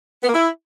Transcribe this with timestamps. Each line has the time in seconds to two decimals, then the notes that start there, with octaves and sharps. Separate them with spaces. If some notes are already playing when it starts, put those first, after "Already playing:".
0.23 B3
0.28 A#3
0.33 E4